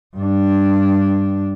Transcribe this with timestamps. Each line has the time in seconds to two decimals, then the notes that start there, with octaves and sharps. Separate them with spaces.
0.16 G2 D4